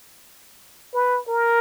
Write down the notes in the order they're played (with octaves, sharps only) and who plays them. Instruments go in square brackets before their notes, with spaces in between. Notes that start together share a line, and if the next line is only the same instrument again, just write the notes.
[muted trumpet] B4
A#4